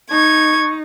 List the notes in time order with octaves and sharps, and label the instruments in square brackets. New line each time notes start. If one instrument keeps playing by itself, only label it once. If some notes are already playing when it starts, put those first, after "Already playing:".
[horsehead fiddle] D#4 [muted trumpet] C#6 [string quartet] G#6